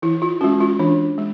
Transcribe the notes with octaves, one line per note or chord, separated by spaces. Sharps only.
E3 E4
F4
G#3 C#4 F#4
F4
E3 D4
G#3